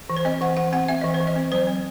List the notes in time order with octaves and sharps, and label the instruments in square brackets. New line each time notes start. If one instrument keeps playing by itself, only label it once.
[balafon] E3
C5
C4 D#5
E3 F#5
E3 F#5
C4 F#5
C4 E5
E3 D#5
C5
E3
D#5
C4
F#3 C5
C4